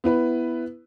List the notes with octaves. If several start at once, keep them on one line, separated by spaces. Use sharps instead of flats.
B3 E4 B4